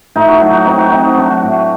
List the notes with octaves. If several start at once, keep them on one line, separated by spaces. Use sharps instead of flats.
A2 D#4
F#4
F#3 D#4
F#4
C4 D#4
F#4
C4 D#4
F#3 D4 F#4
A2